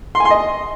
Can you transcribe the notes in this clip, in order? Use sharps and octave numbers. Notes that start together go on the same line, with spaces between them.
C6
G#5
C6
D#5